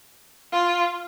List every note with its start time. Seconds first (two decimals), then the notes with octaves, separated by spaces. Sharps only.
0.52 F4